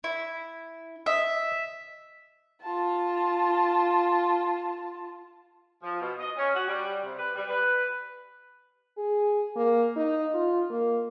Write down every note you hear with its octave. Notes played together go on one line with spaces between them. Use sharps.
E4
D#5 E5
F4 A5
F3
B2
D#5
C#4
F#4
G3
C3
B4
G3
B4
G#4
A#3
D#4
F4
A#3